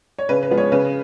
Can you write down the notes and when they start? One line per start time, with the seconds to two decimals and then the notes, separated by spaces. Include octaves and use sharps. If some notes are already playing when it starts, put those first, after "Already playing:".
0.19 C#5
0.29 C#3 B4
0.43 B4
0.51 F3 G#3 B3
0.58 C#5
0.72 C#3 B4